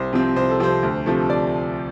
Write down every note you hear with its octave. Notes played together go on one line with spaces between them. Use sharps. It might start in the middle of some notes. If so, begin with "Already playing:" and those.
Already playing: C2 C5
C3 F3 C4
C2 C5
A4
C3 F3 C4 C5
D2
C3 F3 A3
D5